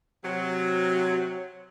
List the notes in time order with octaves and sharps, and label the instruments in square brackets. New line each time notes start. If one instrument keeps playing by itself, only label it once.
[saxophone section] C3 F#3